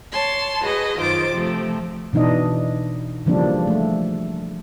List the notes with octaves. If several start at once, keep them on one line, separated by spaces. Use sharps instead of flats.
C#5 A5 C6
F#4 G#4 B4 D#5
F#2 D#3 F4 C5 D6 A6
C3 F3 A3
B2 E3 D4 D#4 D#5
C#3 E3 F3 G3 A#3 D4
A3